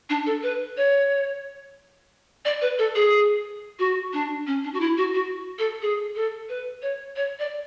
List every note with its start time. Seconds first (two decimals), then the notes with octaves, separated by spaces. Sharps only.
0.10 D4
0.26 A4
0.43 B4
0.77 C#5
2.45 D5
2.62 B4
2.79 A4
2.95 G#4
3.79 F#4
4.13 D4
4.47 C#4
4.64 D4
4.74 F#4
4.81 E4
4.98 F#4
5.14 F#4
5.59 A4
5.82 G#4
6.15 A4
6.49 B4
6.82 C#5
7.16 C#5
7.39 D5